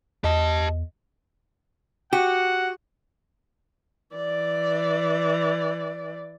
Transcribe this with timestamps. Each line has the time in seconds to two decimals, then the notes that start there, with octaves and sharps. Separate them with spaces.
0.24 E2 G4 D#5 A5
2.13 F#4 G4 F#5
4.16 E3 D5